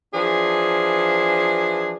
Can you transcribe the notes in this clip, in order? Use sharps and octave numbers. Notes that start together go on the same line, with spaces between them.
E3 F3 D4 G#4